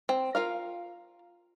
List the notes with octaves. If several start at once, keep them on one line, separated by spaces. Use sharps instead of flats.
C4
F4 A#4 F5